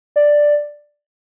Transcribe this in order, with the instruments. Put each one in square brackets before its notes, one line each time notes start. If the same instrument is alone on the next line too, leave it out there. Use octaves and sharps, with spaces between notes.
[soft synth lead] D5